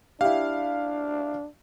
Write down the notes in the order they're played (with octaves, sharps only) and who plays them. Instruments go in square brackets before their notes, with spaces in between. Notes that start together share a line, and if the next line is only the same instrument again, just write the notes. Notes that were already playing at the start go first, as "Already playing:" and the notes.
[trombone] D4 [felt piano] E4 G4 [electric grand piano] F5